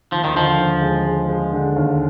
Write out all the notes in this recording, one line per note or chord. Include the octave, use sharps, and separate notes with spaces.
D#2 F3
D#3
D3 F3
D#2
G#3
G#3
G#3
D3
D#2